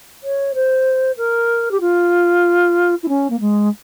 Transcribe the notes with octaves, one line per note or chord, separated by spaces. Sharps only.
C#5
C5
A#4
G4
F4
E4
C#4
A#3
G#3